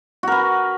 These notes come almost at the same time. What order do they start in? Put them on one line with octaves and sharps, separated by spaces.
F#4 A#4 B4